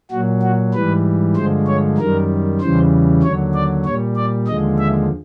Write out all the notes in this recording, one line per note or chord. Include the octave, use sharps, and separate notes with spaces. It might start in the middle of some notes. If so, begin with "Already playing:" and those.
A#2 F#3 F#4
F#4
G#2 E3 G3 B4
G2 D3 F3 G#3 C5
C#5
F#2 D#3 G3 A#4
E2 C#3 E3 G3 C5
D#2 D3 F#3 C#5
D5
A#2 G3 C#5
D5
D#2 D3 F3 G#3 D#5
E5